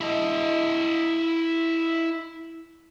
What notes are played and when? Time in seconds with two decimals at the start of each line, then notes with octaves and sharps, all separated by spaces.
0.01 E4 D#5